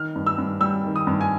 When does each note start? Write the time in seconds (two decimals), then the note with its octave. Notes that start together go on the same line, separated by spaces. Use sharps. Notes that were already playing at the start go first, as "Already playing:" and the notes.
Already playing: D#3 F6
0.16 G2
0.27 E6
0.38 G2
0.60 G3 E6
0.84 D#3
0.96 D#6
1.07 G2
1.21 G#5